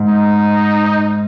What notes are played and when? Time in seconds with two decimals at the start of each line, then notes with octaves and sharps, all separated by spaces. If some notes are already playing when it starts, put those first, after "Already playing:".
Already playing: G#2
0.09 D#4